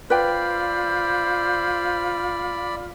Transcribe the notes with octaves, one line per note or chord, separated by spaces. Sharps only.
F4 B4 C5 D5 G5 B5